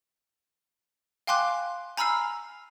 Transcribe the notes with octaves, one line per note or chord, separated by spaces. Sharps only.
F5 G5 G#5 C6 D6 F#6
G#5 A#5 B5 E6 F6 C7